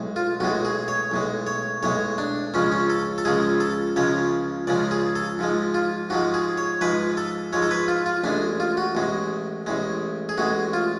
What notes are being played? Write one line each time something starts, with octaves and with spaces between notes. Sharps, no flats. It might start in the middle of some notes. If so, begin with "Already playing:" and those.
Already playing: B1 A2 G#3
F4
B1 A2 G#3 F#4
G#4
C#5
B1 A2 G#3
C#5
B1 A2 G#3 C#5
D4
C#2 C#3 F3 G#3 C#4
C#4
A4
A4
C#2 C#3 F3 G#3 G#4
A4
C#2 C#3 F3 G#3 C#5
C#2 C#3 F3 G#3 D5
G#4
A4
G#2 F3 G#3
F4
G#2 F3 G#3 F#4
G#4
C#5
G#2 F3 G#3 B4
A4
G#2 F3 G#3 C#5
A4
B4
F4
F4
A1 A2 G#3 D4
F4
F#4
A1 A2 G#3
A1 A2 G#3
G#4
A1 A2 G#3 F#4
F4